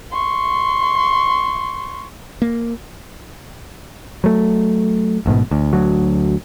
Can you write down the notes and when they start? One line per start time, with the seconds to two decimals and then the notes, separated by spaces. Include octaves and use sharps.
0.12 C6 C#6
2.42 A#3
4.24 F#3 A3
5.26 A1 G#2 B2
5.51 D2
5.73 D2 F#3